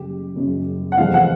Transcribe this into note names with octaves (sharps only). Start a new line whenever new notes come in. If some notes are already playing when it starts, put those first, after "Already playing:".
Already playing: F#1 F#2 C#3 G4
F#1 F#2 C#3
F#5
F1 E2 C3 F3 A3 F5
F#5